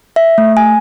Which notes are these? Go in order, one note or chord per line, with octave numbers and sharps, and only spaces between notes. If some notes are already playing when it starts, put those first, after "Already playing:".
E5
A3
G#5